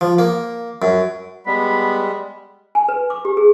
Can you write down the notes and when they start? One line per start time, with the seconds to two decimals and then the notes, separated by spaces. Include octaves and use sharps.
0.01 F3
0.19 A#3
0.82 F#2
1.46 G3 G#3 B3 B5
2.75 G#5
2.89 B4
3.10 D6
3.25 G4
3.37 G#4